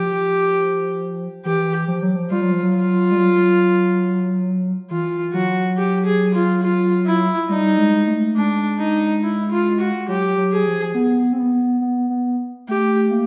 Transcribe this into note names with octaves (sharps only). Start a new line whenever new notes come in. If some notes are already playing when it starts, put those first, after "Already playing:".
Already playing: F3 G4
E3 G4
F3
F#3
F3
G3 F4
F#3
F3
F#3
F4
G3
F#3
E3 F4
F#3 F#4
G4
G#4
F4
F4
E4
G3 D#4
G#3
A3
G#3 D4
D#4
E4
F4
F#4
F#3 G4
F#3
G#4
F3
B3
C4
B3
B3
B3
A3 G4
A#3